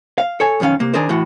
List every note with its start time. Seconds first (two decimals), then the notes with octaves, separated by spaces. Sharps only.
0.18 F5
0.40 A4 C#5 G#5
0.60 B1 F2 D#3 C#4 F5
0.80 C3 A#3
0.94 D#3 D4 G#4 A#4 C5
1.09 A2 E3 F#4